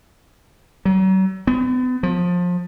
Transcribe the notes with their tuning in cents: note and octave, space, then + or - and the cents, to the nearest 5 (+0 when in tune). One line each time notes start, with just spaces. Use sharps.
F#3 +40
B3 +40
F3 +25